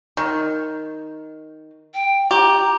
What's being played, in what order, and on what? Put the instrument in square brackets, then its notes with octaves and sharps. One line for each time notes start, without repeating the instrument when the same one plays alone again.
[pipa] D#3
[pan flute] G5
[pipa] G4 [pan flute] A#5